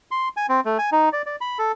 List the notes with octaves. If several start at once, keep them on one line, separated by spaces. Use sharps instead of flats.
C6
G#5
C4
A3
G#5
D#4
D5
D5
B5
A4